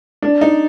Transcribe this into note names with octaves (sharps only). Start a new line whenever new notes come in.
D4
D#4